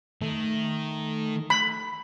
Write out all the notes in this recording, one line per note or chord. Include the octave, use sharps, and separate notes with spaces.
D#3 A3
B5